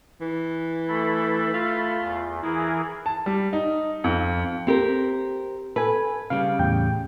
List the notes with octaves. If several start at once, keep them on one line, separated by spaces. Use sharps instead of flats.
E3
A3 A4 B5
F4
E2
E3 E4 G#4 A#4
A5
G3
D#4
F2
C4 G4 A#4
A4 B4 G#5
C#3 G3 F5
E2 A2 G5